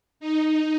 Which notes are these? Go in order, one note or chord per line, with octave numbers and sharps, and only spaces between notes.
D#4